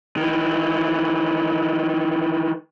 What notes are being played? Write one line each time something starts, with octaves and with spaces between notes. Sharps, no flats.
D#3 E3